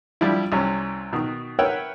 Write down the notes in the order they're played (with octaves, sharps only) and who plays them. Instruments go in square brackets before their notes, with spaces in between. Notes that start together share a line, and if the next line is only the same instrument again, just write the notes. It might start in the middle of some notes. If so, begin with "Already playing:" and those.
[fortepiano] F3 G3 D4 E4
C2 C3 C#4
B2 D#3
A#4 B4 C#5 E5 F#5 G5